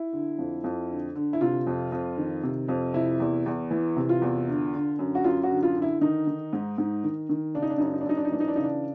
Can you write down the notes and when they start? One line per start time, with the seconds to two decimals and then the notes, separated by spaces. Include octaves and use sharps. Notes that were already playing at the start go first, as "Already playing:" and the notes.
Already playing: E4
0.13 D3
0.38 F2
0.64 F2
0.90 D3
1.15 D3
1.33 E4
1.41 C3 F4
1.67 F2
1.92 F2
2.18 D#3
2.43 C3
2.68 F2
2.94 C3 E4
3.20 E2
3.46 E2
3.71 E3
3.96 C3
4.09 F4
4.22 E2
4.48 D3
4.73 D3
4.99 F#2
5.15 F#4
5.24 F#2 F4
5.43 F#4
5.50 D3
5.63 F4
5.76 D3
5.82 E4
6.01 D#3 D#4
6.27 D#3
6.53 G#2
6.78 G#2
7.04 D#3
7.29 D#3
7.54 C#3 D4
7.62 D#4
7.70 D4
7.78 F#2 D#4
7.85 D4
7.93 D#4
8.01 D4
8.06 F#2 D#4
8.17 D4
8.25 D#4
8.32 E3 D4
8.40 D#4
8.48 D4
8.56 C#3 D#4
8.63 D4